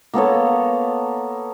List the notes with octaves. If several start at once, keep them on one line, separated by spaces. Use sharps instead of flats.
A#3 B3 A4 C#5